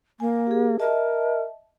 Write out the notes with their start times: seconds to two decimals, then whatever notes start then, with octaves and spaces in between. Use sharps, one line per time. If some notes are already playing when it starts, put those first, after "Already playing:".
0.20 A#3 G#5
0.47 G4 G#4
0.79 A#4 D#5 E5 A5